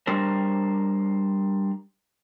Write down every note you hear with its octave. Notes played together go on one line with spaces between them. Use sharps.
G3 D4 A#4 C5